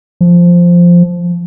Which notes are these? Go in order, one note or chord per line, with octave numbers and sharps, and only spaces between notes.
F3